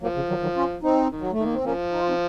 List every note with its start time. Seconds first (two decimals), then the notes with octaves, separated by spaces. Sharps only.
0.02 F3 F#3 A#3
0.15 C#3
0.29 D#3 F#3
0.42 D#3 F#3
0.56 C#4 F4
0.83 C4 D#4
1.11 D#3
1.20 F#3
1.32 A3
1.38 D#3
1.43 A#3
1.54 C4
1.64 F3 A#3 C#4
1.92 D#4
2.00 F4
2.08 C4 D#4